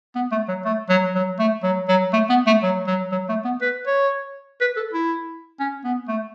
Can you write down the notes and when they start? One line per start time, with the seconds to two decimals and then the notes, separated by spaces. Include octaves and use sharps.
0.15 B3
0.32 A3
0.48 F#3
0.65 A3
0.89 F#3
1.15 F#3
1.39 A3
1.63 F#3
1.88 F#3
2.13 A3
2.29 B3
2.46 A3
2.63 F#3
2.87 F#3
3.12 F#3
3.29 A3
3.44 B3
3.61 B4
3.86 C#5
4.61 B4
4.76 A4
4.93 E4
5.60 C#4
5.84 B3
6.08 A3